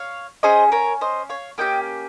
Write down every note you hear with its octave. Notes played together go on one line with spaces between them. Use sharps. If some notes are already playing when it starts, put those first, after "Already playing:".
Already playing: C#5 F5
C#4 G#4 C5 D#5
A#4 C#5
C5 D#5
C#5 F5
A#3 C#4 G4 D#5 G5